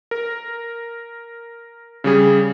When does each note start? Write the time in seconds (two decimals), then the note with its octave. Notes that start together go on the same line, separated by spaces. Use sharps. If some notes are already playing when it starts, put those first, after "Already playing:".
0.11 A#4
2.04 C#3 G3 G#4